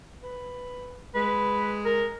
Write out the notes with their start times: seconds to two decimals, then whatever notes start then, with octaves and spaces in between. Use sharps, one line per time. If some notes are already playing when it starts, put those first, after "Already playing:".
0.22 B4
1.15 G#3 B4
1.85 A#4